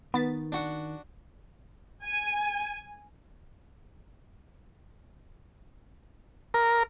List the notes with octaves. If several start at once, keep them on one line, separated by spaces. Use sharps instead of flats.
D#3 B3 A6 B6
D4 F#4 F#5
G#5
A#4